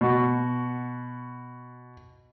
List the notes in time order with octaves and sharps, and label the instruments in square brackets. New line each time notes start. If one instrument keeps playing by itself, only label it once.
[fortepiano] B2 F#4